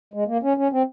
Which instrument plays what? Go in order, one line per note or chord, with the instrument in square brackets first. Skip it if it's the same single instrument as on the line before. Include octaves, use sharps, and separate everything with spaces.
[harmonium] G#3
A#3
C#4
C#4
C4